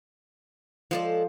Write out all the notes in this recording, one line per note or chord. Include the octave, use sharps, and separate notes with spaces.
F3 G#3 A4 C5 D5